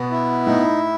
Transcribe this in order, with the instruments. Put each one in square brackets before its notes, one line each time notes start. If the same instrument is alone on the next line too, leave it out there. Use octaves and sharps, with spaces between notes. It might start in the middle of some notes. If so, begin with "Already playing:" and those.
Already playing: [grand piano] B2 [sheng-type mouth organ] B3
[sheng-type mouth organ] E4
[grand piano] A2 [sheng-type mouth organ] D#4